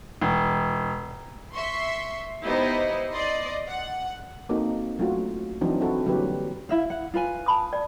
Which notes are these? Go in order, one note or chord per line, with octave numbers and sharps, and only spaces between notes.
E1
E5 C6 C#6
B3 D#4 E4 G4 C5 D#5
D5 D#5 C6
F#5
A#3 C4 D#4 F#4 A4
F#3 A3 C#4 F4 F#4
E3 F#3 C4 D4 D#4
C4 E4 F#4 A4
D3 F#3 G3 A#3 G4 B4
E4 E5 F5
F#5
F4 B4 G#5
A5 B5 D#6
D5